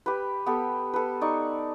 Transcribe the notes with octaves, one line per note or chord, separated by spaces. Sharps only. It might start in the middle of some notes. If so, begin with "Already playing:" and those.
G4 B4
B3 G4 A4
A4 B4
D#4 D5 C#6